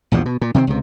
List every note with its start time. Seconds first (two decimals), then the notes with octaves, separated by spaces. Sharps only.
0.12 A#1 E2 G2 F3
0.26 B2
0.41 A#2
0.54 C3 D#3 A#3 C4
0.67 C#2 C3